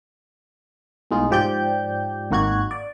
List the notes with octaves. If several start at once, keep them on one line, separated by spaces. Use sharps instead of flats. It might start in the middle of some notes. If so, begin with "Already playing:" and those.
B1 A2 G#3 D#4 F4
G#2 F3 G4 D5 G6
G#1 D#3 A#3 F#4 F#6 G#6
D5